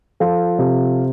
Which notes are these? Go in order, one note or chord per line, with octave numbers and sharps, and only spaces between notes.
F3 F4 A4
C3